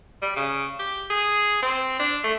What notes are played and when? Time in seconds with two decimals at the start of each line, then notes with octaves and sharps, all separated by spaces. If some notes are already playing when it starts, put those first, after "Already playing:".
0.22 G3
0.36 C#3
0.79 G4
1.10 G#4
1.62 C4
1.99 D4
2.24 A3